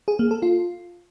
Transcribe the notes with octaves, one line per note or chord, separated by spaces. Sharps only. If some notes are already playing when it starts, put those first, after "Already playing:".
G#4
A#3
A4
F4